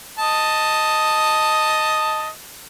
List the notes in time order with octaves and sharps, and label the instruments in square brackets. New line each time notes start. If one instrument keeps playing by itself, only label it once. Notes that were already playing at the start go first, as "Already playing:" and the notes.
[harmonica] D#5 A5